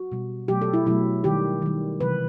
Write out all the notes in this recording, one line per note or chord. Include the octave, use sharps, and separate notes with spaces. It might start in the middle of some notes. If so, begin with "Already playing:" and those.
Already playing: F#4
B2 G3
B2 F#3 A3 G4
A4
E4
B2 F#3 A3 E4
D#3 G3 G4
D#3 G3
C3 E3 G3 B4